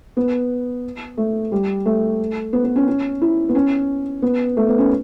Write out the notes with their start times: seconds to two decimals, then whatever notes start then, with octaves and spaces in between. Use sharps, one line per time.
0.17 B3
1.17 A3
1.52 G3
1.86 A3
2.53 B3
2.64 B3
2.76 C#4
2.87 C#4
3.21 E4
3.49 B3
3.55 C#4
4.22 B3
4.57 A3
4.68 B3
4.78 C#4